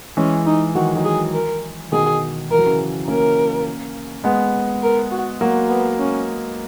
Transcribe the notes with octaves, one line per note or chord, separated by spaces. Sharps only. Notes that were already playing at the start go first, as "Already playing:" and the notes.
E3 G#3 C#4
D#4
D#3 F#3 F#4
D#3 F#3
G#4
A#4
B2 D#3 G#4
E3 A#4
F#3
C#3 E3
A#3 C#4 A#4
G#3 B3
A#4
F#4
F#3 A#3 F#4
B3
C#4